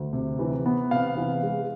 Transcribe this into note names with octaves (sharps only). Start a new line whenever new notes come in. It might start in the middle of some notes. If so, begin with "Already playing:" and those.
Already playing: D2
C3
E3
B3
C3 F5
E3
G#3